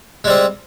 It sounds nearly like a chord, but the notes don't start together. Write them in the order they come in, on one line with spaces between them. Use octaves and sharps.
G#3 G3 C4